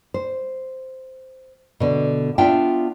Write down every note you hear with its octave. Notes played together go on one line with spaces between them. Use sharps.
C5
B2 D3
B3 D4 F4 E5 G5